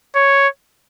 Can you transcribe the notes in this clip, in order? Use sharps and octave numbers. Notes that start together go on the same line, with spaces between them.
C#5